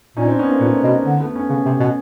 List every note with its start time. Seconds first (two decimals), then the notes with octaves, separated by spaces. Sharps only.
0.17 A#2 C#4 D#4
0.27 C4 D4
0.39 B3 C#4
0.50 A#3 C4
0.61 A#2 A3 B3
0.84 B2
1.05 D3
1.20 A3 B3
1.35 B3 C#4
1.50 C#3 B3 C#4
1.65 C3
1.80 B2